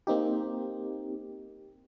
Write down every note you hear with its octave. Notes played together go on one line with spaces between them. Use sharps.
A#3 C4 D#4 G4